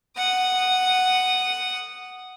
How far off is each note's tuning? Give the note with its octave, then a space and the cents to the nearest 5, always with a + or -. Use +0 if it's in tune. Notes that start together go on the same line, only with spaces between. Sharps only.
F#5 +0 D#6 -10